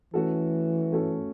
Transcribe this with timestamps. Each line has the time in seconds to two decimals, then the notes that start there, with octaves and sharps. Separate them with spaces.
0.14 E3 A3 C#4 F#4 A4
0.92 A3 C#4 F#4 A4